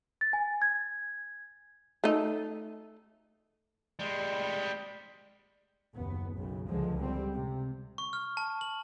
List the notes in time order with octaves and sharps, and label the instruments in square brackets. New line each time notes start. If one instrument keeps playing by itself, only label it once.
[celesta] A6
G#5
G#6
[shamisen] A3 D#4
[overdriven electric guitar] G3 G#3
[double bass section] F#1 D#2 B3
B1 F#2 C#3
C#2 D3 F3 G#3
G3 C4
C3
[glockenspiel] C#6
F6
A5
F#7